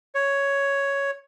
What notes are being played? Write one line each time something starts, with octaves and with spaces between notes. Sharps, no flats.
C#5